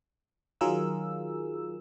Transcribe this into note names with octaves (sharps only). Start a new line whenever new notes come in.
D#3 F#3 F4 G#4 A#4 E6